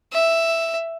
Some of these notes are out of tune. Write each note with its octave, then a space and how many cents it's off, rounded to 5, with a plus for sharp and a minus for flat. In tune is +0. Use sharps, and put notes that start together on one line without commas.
E5 +5